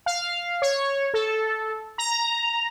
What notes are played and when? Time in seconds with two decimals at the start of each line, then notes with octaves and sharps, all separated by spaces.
0.06 F5
0.62 C#5
1.14 A4
1.98 A#5